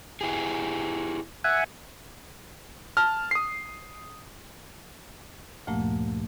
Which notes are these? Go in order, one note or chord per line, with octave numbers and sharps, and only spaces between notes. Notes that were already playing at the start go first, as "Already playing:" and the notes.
E4 G4 G#4
E5 F#5 G#5
A5 F6
D#6 C7
D2 G2 A#2 F3 A3 A#3